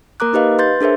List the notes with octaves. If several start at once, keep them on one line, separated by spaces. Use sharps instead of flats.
A#3 A#4 A#5 D6 F#6
D#4 G4 B4 D#5 F5
B4 C6 G6 A6
D4 G#4 A#4 C5 E5